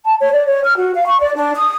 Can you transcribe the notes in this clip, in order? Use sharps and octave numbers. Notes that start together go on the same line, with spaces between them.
A5
C#5
D5
C#5
F6
F#4
F5
C#6
D5
D4
D#6